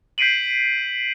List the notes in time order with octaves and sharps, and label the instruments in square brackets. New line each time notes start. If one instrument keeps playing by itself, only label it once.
[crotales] G6 B6 C7 D7 D#7 F#7